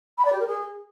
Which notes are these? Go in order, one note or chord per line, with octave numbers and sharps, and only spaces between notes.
B5
D5
G4
A#4
G#4